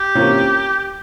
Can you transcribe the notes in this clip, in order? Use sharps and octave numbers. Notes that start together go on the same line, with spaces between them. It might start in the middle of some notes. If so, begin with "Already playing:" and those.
Already playing: G4
C3 E3 A#3 C#4 F4